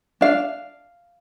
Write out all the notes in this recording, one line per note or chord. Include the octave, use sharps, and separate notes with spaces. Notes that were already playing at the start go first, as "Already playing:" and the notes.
D4 F5